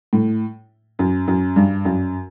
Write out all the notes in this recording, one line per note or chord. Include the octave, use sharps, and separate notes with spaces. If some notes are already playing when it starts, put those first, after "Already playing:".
A2
F#2
F#2
G2
F#2